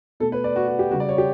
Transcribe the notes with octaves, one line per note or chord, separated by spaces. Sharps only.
B2 A3 A4
B4
D5
F#4
F#4
G4
C#3 G3 F#4
D5
C#5
G4